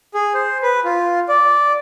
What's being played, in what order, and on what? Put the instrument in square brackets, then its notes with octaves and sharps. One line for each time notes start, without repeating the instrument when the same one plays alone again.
[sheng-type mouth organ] G#4
C5
B4
F4
D5